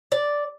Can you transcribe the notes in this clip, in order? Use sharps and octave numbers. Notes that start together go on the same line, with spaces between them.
D5